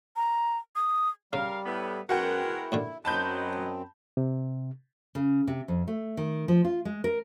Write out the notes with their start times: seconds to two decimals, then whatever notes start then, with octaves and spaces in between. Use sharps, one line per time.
0.16 A#5
0.76 D#6
1.33 C#3 G3 A#4 F5
1.66 A2 B3
2.09 F#2 G#3 B3 F#4 A#4 F#5 G5
2.45 E4
2.72 D#2 A#2 D3
3.05 F#2 F#3 C4 D#5 A5 B5 G6
4.17 C3
5.15 C#3
5.47 C3
5.68 F2
5.87 A3
6.17 D#3
6.48 F3
6.65 F4
6.85 G#3
7.04 A#4